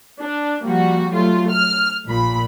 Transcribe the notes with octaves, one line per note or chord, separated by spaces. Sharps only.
D4
F3 G3 A#3 F#4
F#3 A3 F4
F6
A#1 A#2 B5